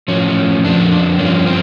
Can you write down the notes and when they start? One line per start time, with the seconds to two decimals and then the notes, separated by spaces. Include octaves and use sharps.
0.08 A2 F3 C#4
0.64 F2 D3 F3 D4
0.92 D4
1.19 G2 D3 F3 C#4
1.46 C4